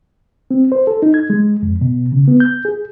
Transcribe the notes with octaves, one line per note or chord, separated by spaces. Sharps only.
C4
C5
A4
D#4
G#6
G#3
F2
B2
C#3
B3
G6
G#4